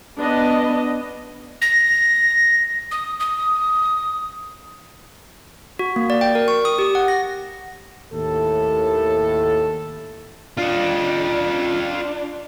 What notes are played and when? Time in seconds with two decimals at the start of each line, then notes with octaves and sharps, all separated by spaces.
0.18 B3 D4 D#5
1.62 A#6
2.91 D#6
3.20 D#6
5.79 F#4
5.96 A#3
6.10 D5
6.21 G5
6.35 A#4
6.48 C#6
6.65 D#6
6.79 G4
6.95 F#5
7.08 A#6
8.11 D#2 A2 A4
10.58 D4 F4 D#5